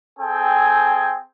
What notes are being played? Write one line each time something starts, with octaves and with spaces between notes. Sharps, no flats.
C4 G#4 A4 G5 G#5